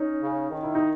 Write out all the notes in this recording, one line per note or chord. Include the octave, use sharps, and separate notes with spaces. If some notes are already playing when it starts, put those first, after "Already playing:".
Already playing: C#4 D#4
C#3
D#3
E4
D#4